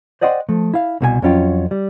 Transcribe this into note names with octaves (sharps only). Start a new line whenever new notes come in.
C5 D5 D#5 F#5 G5 C6
F3 A3
E4 F5
C2 B2 G#4 G#5
F2 F#3 C#4 F4 G5
G3